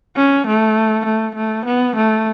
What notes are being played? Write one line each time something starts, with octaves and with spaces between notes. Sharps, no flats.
C#4
A3
A3
A3
B3
A3